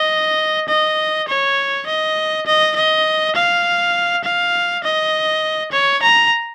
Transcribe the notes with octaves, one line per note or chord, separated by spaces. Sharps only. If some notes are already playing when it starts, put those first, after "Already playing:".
Already playing: D#5
D#5
C#5
D#5
D#5
D#5
F5
F5
D#5
C#5
A#5